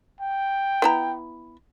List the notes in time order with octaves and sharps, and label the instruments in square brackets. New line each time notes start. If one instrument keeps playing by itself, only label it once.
[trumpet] G5
[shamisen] B3 E4 A#5